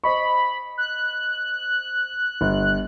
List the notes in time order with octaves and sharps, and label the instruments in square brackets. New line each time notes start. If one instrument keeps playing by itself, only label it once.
[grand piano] C5 D#5 C#6 [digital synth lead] B5
[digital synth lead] F#6
[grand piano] G1